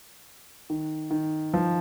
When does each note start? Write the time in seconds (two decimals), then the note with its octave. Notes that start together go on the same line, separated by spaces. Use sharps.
0.70 D#3
1.11 D#3
1.54 F3